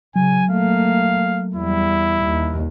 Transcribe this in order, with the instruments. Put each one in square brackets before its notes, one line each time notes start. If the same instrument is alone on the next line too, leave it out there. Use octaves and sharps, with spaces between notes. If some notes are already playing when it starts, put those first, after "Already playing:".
[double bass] C#3 [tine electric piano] F#3 [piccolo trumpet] G#5
[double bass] A3 A#3 [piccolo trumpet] F5
[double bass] E2 G3 [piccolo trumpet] E4
[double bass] D#2